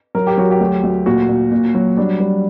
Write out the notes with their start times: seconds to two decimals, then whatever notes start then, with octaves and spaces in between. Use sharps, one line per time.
0.15 F#3 A#4
0.27 G4
0.37 F#3 F#4
0.51 G4
0.60 D2
0.83 D2
1.06 A#2 F#4
1.29 A#2
1.51 A#2
1.75 F#3
1.97 G3 D4
2.20 G3